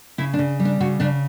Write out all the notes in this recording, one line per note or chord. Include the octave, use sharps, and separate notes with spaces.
C#3 E4
D4
C#3
G3
D4
C#3 F#4
C#3 D4